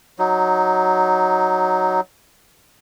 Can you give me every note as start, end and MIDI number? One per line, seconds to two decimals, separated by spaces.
0.19 2.00 54
0.19 2.00 63